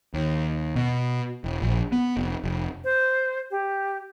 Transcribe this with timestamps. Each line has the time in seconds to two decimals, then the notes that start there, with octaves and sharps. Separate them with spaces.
0.14 D#2
0.76 B2
1.44 E1
1.62 A#1
1.92 B3
2.17 F1
2.44 F1
2.84 C5
3.51 G4